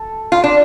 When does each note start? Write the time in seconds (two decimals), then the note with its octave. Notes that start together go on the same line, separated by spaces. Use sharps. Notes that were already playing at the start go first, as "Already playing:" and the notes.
Already playing: A4
0.32 F4
0.44 D4